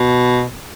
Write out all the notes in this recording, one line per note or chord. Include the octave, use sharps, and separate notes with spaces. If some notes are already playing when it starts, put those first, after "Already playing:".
Already playing: B2